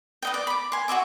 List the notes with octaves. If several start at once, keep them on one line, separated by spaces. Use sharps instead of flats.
B4 D#5 G5
D5
B5 D6
G#5 C6
F#4 D5 E5 D6